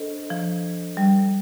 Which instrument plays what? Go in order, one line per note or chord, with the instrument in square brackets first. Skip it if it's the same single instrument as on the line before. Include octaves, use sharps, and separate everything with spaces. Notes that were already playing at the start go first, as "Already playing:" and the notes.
Already playing: [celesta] D4 A4 C5 D#5
[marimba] F3
G3